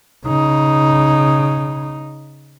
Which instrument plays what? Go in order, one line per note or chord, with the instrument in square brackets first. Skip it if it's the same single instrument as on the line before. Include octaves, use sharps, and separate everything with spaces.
[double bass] C#3 D#4